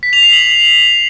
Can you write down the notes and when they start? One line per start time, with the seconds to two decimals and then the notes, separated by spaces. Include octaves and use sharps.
0.03 B6
0.13 F7
0.23 C7
0.33 F#7